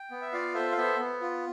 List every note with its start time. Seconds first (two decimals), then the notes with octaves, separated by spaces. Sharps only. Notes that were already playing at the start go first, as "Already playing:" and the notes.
Already playing: G5
0.11 B3
0.22 E5
0.33 F4 D5 F5
0.54 A4 C5 E5
0.72 F5
0.77 B3 C5 E5
0.99 B3
1.21 F4